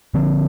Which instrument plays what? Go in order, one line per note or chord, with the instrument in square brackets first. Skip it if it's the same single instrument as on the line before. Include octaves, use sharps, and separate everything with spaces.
[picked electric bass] D3 F3 C4